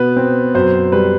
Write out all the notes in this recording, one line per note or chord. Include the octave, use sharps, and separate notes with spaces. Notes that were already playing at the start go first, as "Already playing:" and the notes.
Already playing: B2 B3 B4
C4
F#2 C5
G3 B4